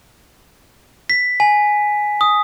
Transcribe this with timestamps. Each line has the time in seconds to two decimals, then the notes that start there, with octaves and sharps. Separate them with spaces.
1.10 B6
1.40 G#5
2.21 D#6